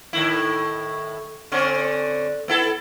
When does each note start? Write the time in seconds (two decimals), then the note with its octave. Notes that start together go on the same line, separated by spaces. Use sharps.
0.13 A2 D#3 E4
1.52 D3 C4 C#4
2.48 B3 E4 A4